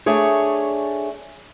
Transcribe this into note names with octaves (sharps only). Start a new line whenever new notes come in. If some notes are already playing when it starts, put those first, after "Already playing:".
A3 D4 G#4 C#5